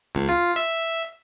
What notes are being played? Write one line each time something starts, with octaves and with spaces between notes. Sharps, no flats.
C#2
F4
E5